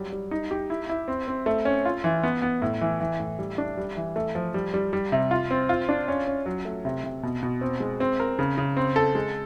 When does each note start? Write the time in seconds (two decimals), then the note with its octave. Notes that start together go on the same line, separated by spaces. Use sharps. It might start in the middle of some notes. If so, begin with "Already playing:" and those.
Already playing: F#3 G3
0.13 G3
0.31 D#4
0.51 G4
0.70 E4
0.89 E4
1.08 C4
1.28 C4
1.46 A3
1.65 C#4
1.85 F4
2.04 E3
2.23 B3
2.42 B3
2.62 A2
2.81 E3
3.00 E3
3.20 A2
3.39 G3
3.58 D4
3.77 G3
3.97 E3
4.16 A3
4.35 F3
4.54 G3
4.74 G3
4.93 G3
5.12 C3
5.31 F4
5.51 C4
5.69 F4
5.89 D4
6.08 C#4
6.27 C#4
6.46 F#3
6.65 A3
6.85 C3
7.04 C3
7.23 B2
7.43 B2
7.61 C4
7.80 G#3
8.00 C4
8.20 A#4
8.39 C#3
8.58 C#3
8.77 C4
8.96 A4
9.15 G#3